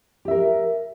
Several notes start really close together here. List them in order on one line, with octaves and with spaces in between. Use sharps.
G4 E5 A#4